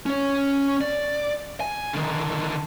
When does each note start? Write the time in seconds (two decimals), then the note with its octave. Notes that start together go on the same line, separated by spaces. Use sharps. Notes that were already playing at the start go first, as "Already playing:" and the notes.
0.06 C#4 C#5
0.81 D5
1.60 G#5
1.93 D3 D#3